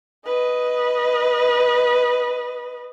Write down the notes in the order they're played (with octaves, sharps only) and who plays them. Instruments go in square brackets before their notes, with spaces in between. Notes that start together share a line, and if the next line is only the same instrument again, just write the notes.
[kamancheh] B4 D#5